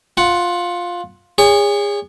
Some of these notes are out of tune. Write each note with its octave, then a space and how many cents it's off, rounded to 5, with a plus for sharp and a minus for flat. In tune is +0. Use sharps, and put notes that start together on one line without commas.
F4 +10 F#5 +0
G#4 -30 C#5 +25